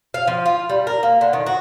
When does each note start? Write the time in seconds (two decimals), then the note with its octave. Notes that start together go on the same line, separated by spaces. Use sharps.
0.14 F5
0.27 F3
0.46 F4
0.69 G3
0.87 A#4
1.03 A#3
1.21 D3
1.33 D#3
1.46 F#4